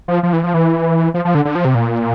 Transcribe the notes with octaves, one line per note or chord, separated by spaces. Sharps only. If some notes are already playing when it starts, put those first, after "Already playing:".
F3
F3
E3
F3
E3
F3
F3
D3
D3
F3
C3
A#2